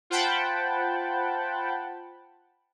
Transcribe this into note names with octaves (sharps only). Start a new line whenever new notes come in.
F4 C5 F#5 G5 A5 B5